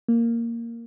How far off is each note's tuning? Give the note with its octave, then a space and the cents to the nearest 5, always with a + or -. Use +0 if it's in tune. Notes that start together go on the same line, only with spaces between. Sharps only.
A#3 -5